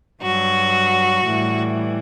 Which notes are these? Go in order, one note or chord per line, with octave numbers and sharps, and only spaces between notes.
G2 F#3 F#4
A2 E3 G3